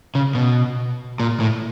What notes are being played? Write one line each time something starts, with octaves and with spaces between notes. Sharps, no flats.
C#3
B2
A#2
A2